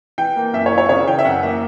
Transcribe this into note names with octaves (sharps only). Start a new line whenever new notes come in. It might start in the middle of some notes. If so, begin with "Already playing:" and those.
E3 G5
A#3
F#2 E5
C#5
E3
C#5
C#3 C#5
E3 G5
E5
F#2 F#5
A#3 E5